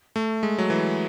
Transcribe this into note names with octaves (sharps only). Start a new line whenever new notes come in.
A3
G#3
F#3
E3